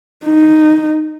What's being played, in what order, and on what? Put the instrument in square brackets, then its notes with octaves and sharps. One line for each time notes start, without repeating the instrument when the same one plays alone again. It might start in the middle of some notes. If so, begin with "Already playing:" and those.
[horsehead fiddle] D#4